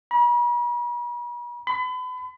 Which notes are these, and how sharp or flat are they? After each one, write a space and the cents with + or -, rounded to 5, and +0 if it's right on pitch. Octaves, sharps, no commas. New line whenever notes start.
B5 -45
B5 +35